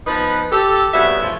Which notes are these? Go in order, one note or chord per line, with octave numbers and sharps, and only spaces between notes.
F3 B3 D#4 B4
G4 A4
F2 C#3 G3 B3 F#4 E5
A2 F3